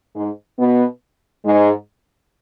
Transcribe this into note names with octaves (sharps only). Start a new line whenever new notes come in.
G#2 G#3
B2 B3
G#2 G#3